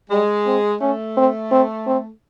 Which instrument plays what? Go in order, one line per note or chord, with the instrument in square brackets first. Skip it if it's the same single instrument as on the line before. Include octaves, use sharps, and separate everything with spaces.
[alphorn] G3 [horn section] G#3
[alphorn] C4
[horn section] A3 [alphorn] C#4
[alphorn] C4
C4
C4